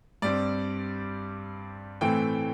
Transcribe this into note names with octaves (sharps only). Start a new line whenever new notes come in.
G2 G3 C4 D5
A2 E3 A3 C4 G5